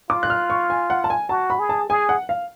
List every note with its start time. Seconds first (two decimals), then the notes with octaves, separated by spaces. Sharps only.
0.10 F4 D6
0.23 F#6
0.30 F6
0.50 C#6
0.70 G#5
0.90 F#5
1.04 A5
1.10 G#5
1.29 F#4 A5
1.50 B5
1.59 G#4
1.69 A5
1.89 G#4 G#5
2.09 F#5
2.29 F5